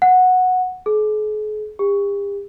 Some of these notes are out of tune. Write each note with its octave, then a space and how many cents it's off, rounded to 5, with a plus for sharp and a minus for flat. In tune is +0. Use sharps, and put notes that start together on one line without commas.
F#5 -10
G#4 +45
G4 +40